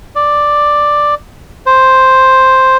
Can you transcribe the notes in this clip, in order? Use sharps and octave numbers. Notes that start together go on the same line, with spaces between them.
D5
C5